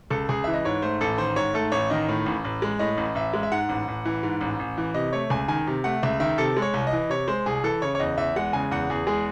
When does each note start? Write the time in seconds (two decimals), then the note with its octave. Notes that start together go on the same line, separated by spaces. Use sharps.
0.10 C#2 A4
0.29 C#2 G#4
0.44 E3 E5
0.54 D#5
0.65 G#2 C#5
0.82 A3 C5
1.01 A1 A4
1.18 D#3 C5
1.36 G#2 C#5
1.54 A3 A4
1.72 A1 C#5
1.90 D#3 D#5
2.09 A2
2.26 A1
2.44 A1
2.62 G#3
2.79 A2 D#5
2.97 A1
3.15 A1 E5
3.34 G#3
3.43 E5
3.51 G#2 F#5
3.69 A1
3.88 A1
4.05 E3
4.23 G#2
4.41 A1
4.59 A1
4.78 E3
4.94 C3 D#5
5.13 A3 C#5
5.30 C#2 G#5
5.48 D#3 G#5
5.67 C3
5.84 A3 F#5
6.03 C#2 E5
6.20 D#3 E5
6.38 C3 A4
6.57 G#3
6.62 C#5
6.74 C2
6.87 D#5
6.93 E3
7.10 C3 C#5
7.28 G#3 C5
7.46 C2 G#4
7.64 E3 A4
7.82 C#3 C#5
7.95 C#5
7.99 E2 D#5
8.17 E2 E5
8.36 G#3 F#5
8.53 C#3 G#5
8.71 E2 F#5
8.90 E2 G#4
9.07 G#3 G#4